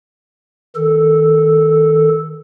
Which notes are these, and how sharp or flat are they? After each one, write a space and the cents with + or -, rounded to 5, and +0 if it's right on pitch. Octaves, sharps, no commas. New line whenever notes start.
D#3 +20 A4 +0